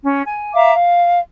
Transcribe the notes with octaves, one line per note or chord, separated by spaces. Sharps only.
C#4
G#5
E5 F5 A#5 D6
F5